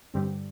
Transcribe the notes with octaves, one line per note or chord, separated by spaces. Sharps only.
G2 D3 G3 C4